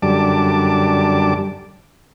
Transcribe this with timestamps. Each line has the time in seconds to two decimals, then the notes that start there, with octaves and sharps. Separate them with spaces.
0.02 F#2 D3 G3 A5 D6